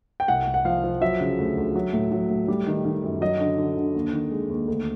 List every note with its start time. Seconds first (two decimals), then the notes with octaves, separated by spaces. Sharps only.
0.20 G5
0.28 C2 F#5
0.47 C2
0.54 F#5
0.65 F3 F5
0.84 F3
1.01 F#3 E5
1.21 C#3
1.38 D2
1.57 D2
1.75 F#3
1.93 A2
2.12 F#3
2.30 A2
2.48 G3
2.67 D#3
2.85 D#3
3.03 F#2
3.21 F#3 D#5
3.40 D3
3.58 D3
3.77 D3
3.95 D#2
4.13 D#3
4.31 G#3
4.50 D#2
4.68 D2